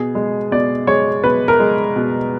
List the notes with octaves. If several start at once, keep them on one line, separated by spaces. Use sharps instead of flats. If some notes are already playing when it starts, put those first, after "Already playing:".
Already playing: B2 G#4
G#3
B2 D5
G#3 C#5
B2 B4
A#4
G#3
B2